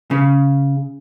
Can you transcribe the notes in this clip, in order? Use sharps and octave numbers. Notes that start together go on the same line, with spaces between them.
C#3